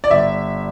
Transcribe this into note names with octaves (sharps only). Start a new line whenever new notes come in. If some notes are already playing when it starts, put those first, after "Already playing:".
D5
G1 E5